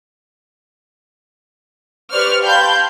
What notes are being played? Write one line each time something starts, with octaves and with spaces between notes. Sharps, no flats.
G4 B4 C5 D5 C#6 F6
F5 G5 A5 B5 C6 G6